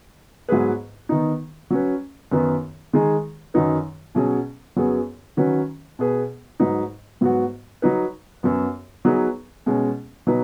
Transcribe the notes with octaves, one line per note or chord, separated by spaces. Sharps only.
G#2 F#3 B3 G#4 B4
D#3 B3 D#4
F#3 C#4 B4
F#2 D#3 B3 D#4 B4
D#3 G#3 D#4 G#4
F#2 D#3 F#3 D#4 B4
B2 F#3 C#4 G#4
F#2 F#3 B3 G#4
D#3 F#3 C#4 F#4 B4
B2 B3 G#4 B4
G#2 F#3 D#4 B4
G#2 F#3 B3 F#4
F#3 D#4 B4
F#2 F#3 B3
F#3 B3 D#4 G#4 B4
B2 G#3 C#4
B2 F#3 D#4 B4